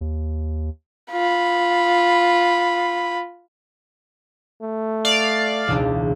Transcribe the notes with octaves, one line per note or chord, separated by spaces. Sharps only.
D#2
F4 B5
A3
D5 F5
E1 C#2 D4